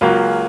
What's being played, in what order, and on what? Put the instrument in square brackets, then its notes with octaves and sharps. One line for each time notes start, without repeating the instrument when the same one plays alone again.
[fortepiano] C#2 C#3 F#3 A#3 [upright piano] F4